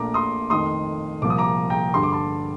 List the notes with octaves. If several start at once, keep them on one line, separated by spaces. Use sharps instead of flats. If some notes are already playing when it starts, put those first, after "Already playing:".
Already playing: A#1 A#2 A3 A#5 D6
C6 D#6
F2 D#3 A3 C6 D#6
C2 A#2 F3 A#3 D6
D#6
A#5 D6
G5 A#5
G2 D3 G3 C6
D6
A5 C6